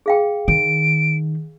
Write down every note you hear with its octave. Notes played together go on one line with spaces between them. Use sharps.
G#4 F5 G5
D#3 D7